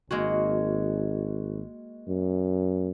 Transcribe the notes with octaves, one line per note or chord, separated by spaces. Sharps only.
G#1 G#3 A#3 F#4
F#2